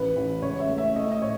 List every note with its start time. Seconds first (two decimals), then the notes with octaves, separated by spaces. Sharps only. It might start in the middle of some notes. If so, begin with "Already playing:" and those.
Already playing: A1 B4
0.16 A1
0.42 C#2 C#5
0.60 E5
0.69 A3
0.78 E5
0.96 A3 D#5
1.04 E5
1.12 D#5
1.22 A2 C#5